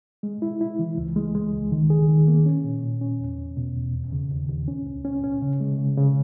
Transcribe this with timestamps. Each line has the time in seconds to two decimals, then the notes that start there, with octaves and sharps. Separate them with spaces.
0.23 G#3
0.42 E4
0.61 E4
0.79 E3
0.98 C#2
1.16 G#3
1.35 G#3
1.53 C#2
1.72 D#3
1.90 G#4
2.09 D#3
2.27 A#3
2.46 C#4
2.64 A#2
2.83 A#2
3.01 C#4
3.20 E2
3.38 E2
3.57 B2
3.75 E2
3.94 D#2
4.12 C#3
4.31 D#2
4.49 D#2
4.68 C#4
4.86 C#2
5.05 C#4
5.24 C#4
5.42 C#3
5.60 G#3
5.79 C#3
5.98 C#3